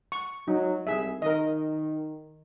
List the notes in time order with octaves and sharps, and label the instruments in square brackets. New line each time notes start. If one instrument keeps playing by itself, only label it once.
[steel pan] C#6
[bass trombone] F#3 [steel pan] D#4
[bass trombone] C2 [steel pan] G#4 E5
[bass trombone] D#3 [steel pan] A#4 D#5